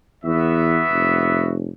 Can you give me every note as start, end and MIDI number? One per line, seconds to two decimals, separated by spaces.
0.24 0.83 40
0.24 1.52 59
0.24 1.52 66
0.24 1.52 76
0.91 1.69 29